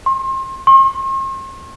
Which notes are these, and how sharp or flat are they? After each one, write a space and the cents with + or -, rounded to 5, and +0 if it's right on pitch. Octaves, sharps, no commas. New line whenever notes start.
C6 +35
C6 +45